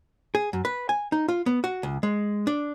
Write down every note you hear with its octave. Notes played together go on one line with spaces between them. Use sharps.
G#4
F#2
B4
G#5
D#4
F4
B3
F#4
C#2
G#3
D4